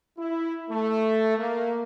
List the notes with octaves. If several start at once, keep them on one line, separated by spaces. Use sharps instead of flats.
E4
A3
A#3